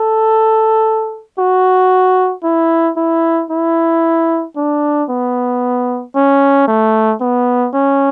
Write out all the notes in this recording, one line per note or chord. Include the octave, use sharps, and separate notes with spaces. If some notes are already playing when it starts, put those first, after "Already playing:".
Already playing: A4
F#4
E4
E4
E4
D4
B3
C#4
A3
B3
C#4